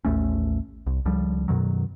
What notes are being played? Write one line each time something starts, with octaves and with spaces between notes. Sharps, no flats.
A1 D#2 A3 C#4
C2
C#2 F3 G3
F#2 B2 D#3 F#3